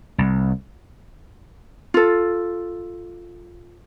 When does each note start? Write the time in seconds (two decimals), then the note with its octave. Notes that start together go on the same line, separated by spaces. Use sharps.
0.18 C2
1.94 F4 A4